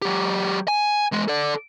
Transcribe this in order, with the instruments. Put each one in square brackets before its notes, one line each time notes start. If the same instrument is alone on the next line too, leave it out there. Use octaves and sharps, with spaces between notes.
[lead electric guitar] F#3 G4
G#5
E2 G#3
A4 D5